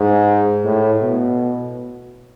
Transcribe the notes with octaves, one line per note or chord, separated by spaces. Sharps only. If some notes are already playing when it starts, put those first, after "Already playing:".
Already playing: G#2
A2
B2